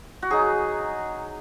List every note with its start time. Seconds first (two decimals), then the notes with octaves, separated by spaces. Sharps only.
0.22 F#4
0.30 F#3 D#4 G#4